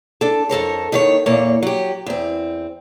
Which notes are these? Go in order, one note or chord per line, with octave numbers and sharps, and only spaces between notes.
D4 A4
F2 A4 A#4 C#5
D#2 D#3 C#5
E2 A#2 A#3 C#5
F#3 G4
E2 C4